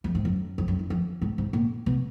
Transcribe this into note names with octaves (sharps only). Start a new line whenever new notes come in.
F2
G#2
F#2
F2
F#2
D#3
F3
G#2
G#2
A#2
B2